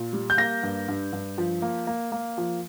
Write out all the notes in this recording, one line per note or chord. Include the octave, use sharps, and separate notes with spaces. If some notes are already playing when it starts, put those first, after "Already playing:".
Already playing: A#2
G3
G6
A#3 A#6
G2
G2
G2
F3
A#3
A#3
A#3
F3